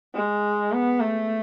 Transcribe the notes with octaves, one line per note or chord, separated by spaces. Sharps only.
G#3
B3
A3